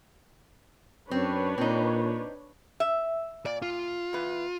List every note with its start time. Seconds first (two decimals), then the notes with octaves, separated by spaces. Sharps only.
1.11 F#2 C4 D4 B4 C#5
1.58 A#2 C4 D#4
2.80 E5
3.46 A#2 D5
3.62 F4
4.13 E2 B4